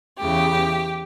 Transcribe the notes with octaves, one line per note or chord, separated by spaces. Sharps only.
E2 C#3 E3 G4